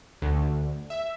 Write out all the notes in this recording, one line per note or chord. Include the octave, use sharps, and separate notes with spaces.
D2
E5